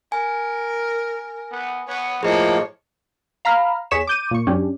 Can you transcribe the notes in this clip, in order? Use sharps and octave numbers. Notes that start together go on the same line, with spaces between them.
A#4 G#5
B3
B3 C#5
A2 F3 A#3 G#4 C#5 D#5
F5 A#5 B5 F6
E2 G#4 C#5 C#6 B6 E7
D6 G6 D#7
A#2 C#6
F#2 C#4 D4 G4